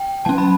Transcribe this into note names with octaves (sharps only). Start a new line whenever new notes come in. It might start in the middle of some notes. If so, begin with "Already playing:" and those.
Already playing: G5
F#3 C#4 A5
B5